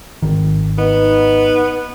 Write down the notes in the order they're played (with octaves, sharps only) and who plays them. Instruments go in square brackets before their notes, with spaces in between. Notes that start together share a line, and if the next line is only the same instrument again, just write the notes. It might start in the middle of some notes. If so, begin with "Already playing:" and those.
[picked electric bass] G#1 D#3
[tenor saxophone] B3 [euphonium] D#4